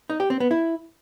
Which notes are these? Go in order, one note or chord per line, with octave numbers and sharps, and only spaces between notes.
D#4
G4
C4
B3
E4